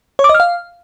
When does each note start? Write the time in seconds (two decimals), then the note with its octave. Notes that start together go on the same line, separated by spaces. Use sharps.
0.19 C#5
0.24 D6
0.29 D#5
0.35 F6
0.40 F5